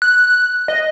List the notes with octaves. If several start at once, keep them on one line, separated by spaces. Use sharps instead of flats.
F#6
D#5